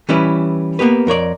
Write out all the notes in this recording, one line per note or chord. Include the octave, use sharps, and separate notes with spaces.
E3 G3 C#4 E4 B4
A#3 B3 G4 B4
F2 A#4 C#5 D5